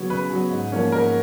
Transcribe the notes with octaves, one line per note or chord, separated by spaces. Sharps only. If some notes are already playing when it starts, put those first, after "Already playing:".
Already playing: C#3 F#3 B3 C#5
C#3 B4
F#3 B3
G#2
F3 A#3 C#4
G#2 A#4